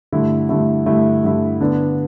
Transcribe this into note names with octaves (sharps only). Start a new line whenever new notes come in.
G2 D3 A3 E4
G2 D3 A3 E4
G2 D3 A3 E4
G2 D3 A3 E4
D3 B3 D4